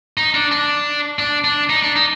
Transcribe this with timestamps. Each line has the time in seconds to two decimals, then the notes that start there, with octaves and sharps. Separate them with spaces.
0.17 D#4
0.34 D4
0.51 D4
1.19 D4
1.44 D4
1.70 D#4
1.83 D4
1.96 D#4